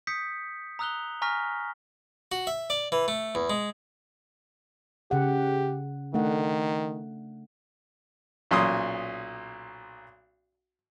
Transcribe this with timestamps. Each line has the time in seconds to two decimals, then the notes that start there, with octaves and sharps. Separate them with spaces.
0.07 D#6 G6 B6 C#7
0.79 A#5 D#6 E6 F#6 F7 G7
1.22 G#5 A#5 C#6 F6 A#6 B6
2.32 F#4
2.47 E5
2.70 D5
2.92 E3
3.08 A3
3.35 E2
3.50 G#3
5.11 C#3 G4 F#5
6.14 D#3 A3 D4 F#5
8.51 B1 A#2 C#4 C6 D#6